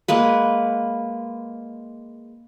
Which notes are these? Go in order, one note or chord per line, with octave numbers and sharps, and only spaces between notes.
G#3 A#3 B4